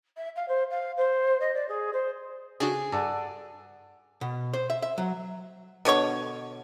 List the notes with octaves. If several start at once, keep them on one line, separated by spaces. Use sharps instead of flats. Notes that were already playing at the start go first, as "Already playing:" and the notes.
E5
F5
C5
F5
C5
D#5
D5
G#4
C5
C#3 D4 F#4 G#4
G2 A4 D5 F#5
B2
C5
E5
E5
F#3
B2 D3 C#5 C#6